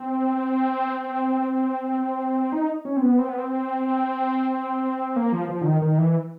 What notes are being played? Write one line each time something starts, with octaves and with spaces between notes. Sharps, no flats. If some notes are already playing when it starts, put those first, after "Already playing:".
Already playing: C4
D#4
C#4
C4
B3
C4
B3
C4
A#3
F3
F3
D3
D#3
D#3
E3